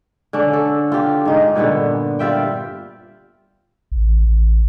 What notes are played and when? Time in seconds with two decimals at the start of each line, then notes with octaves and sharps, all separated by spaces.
0.33 D3 C#4 D4
0.53 A4
0.92 F4 G4
1.25 G#2 D#4
1.55 G2 A#2 D3 B3
2.19 G3 F4 E5 G5
3.91 A1
4.20 A1